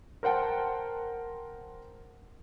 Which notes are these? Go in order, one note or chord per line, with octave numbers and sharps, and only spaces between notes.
A#4 C5 F#5 G5 A5